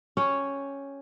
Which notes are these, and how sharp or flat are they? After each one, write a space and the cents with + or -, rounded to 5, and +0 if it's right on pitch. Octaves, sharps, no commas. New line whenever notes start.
C#4 +0 G4 +0 C#5 +0